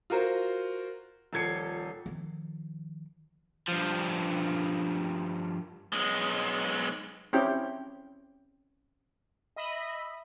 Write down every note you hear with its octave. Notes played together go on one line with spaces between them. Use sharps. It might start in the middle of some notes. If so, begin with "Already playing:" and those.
F4 F#4 A#4 C5
D#1 F3 A4 G#6 C7 C#7
D#3 F3
G2 F3
B1 G#3
C4 C#4 E4 G4 G5
D#5 E5 B5